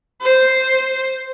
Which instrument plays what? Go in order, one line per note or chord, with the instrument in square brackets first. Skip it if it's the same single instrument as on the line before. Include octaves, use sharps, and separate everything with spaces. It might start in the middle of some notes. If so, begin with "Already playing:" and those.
[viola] C5